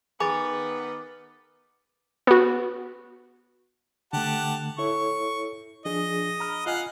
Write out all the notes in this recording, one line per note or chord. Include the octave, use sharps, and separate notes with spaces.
D#3 B3 G#4 G#5 B5 D6 A6
B3 F#4
D3 A3 G4 F#5 A5
E4 A4 C#5 C#6
F3 D4 G#4 D#5
A#5 B5 F6
F4 D#5 F5 F#5 G#5